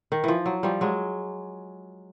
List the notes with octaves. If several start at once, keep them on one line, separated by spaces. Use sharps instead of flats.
D#3
E3 F3
F#3
F3 G3
F#3 G#3